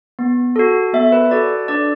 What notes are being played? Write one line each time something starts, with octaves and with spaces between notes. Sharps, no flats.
B3
F#4 A4
B3 E5
B4
F#4 A4 D5
D4 D5